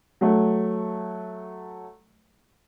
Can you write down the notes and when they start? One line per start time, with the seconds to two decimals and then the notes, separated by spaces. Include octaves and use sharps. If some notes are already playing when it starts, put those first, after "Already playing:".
0.21 F#3 A3